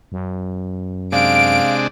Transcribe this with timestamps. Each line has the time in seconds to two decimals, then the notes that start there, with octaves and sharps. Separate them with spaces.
0.12 F#2
1.12 C3 G#3 D4 F5 D7